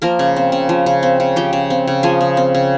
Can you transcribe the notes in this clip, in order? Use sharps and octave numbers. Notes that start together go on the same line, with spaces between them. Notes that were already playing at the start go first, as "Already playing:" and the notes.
F3 A#3 A#4
C#3
C4
C#3
F3
C#3
C4
C#3
F3 G4 G5
C#3
C4
C#3
F3 G#4 G#5
C#3
C4
C#3